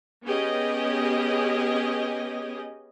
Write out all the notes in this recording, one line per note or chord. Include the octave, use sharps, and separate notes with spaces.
B3 C#4 G4 G#4 D#5